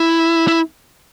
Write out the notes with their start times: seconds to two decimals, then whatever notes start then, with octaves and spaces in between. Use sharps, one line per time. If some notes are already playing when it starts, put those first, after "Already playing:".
Already playing: E4
0.48 E4